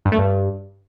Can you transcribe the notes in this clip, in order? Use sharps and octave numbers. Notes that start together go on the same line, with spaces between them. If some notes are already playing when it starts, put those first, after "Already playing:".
G2
A3
G2